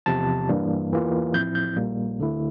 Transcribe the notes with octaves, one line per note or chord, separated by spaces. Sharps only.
E2 C3 F3 A5
G2 E3 G3 A#3 D4
E2 E3 A#3 F4
A2 F3 C4 E4 G6
G6
A#1 A#2 G3 A#3
D2 D3 A3 E4